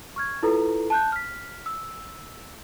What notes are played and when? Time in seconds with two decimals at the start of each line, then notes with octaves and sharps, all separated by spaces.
0.16 C#6 F6 G#6
0.43 E4 F4 A4 B4 A#5
0.90 A5 F#6 G6
1.12 F6 B6
1.66 E6